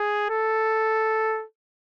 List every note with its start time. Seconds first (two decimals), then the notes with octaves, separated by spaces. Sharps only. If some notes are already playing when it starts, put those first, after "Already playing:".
Already playing: G#4
0.30 A4